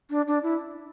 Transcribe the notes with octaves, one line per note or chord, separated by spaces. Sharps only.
D4
D4
E4